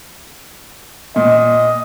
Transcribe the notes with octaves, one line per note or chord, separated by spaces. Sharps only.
A#2 D#5